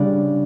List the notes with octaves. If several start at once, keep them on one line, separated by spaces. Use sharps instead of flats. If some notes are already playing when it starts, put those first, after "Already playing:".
Already playing: C#3 G3 D4 D5